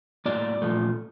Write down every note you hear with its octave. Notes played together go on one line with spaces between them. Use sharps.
A2 F#3 A#3 D5
A#2 F3 A3